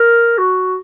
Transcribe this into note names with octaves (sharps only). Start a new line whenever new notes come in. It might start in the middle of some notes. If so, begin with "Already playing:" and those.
Already playing: A#4
F#4